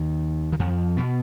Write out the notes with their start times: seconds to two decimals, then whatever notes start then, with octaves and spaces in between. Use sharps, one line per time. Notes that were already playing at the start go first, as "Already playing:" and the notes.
Already playing: D#2 D#3
0.52 D#3
0.59 F2 F3
0.97 B2 B3